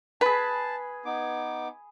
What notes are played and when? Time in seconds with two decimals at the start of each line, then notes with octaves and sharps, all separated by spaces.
0.21 G#4 B4 A5 B5
1.05 B3 D#4 D6